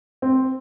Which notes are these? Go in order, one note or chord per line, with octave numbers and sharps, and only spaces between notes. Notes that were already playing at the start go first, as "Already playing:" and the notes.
C4